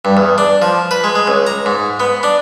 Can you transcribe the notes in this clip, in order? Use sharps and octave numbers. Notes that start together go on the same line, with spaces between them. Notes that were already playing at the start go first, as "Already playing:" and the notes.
G2
E2
D4
F3
B4
G#3
G#3
C#2
A#5
G#2
B3
D4